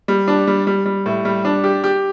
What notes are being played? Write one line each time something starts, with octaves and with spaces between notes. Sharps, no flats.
G3
D4
G3
G3
G3
A2
G3
D4
G4
G4